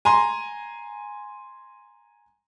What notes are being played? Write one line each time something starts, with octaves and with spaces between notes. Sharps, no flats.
G#5 A#5 C6